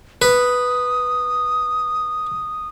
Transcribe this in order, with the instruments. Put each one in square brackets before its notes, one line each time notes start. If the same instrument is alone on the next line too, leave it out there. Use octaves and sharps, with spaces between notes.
[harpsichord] B4 [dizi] D#6